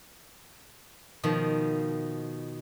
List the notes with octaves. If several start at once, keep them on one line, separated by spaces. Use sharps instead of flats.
B2 D#3 F3